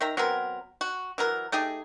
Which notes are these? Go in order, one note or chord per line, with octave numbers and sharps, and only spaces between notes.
D#3 E5 A#5
F#3 B3 C4 A#4
F#4
E3 F#3 A#4
A3 D#4 G4 G#4